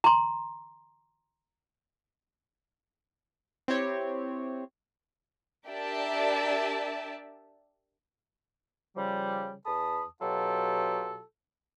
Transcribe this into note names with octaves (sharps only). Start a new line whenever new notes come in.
A#5 C6
C4 E4 G4 C#5
D4 G4 A#4 D5 E5 A5
C#3 F3 G3
E2 A5 B5 D#6
B2 F#3 F4 G4 A4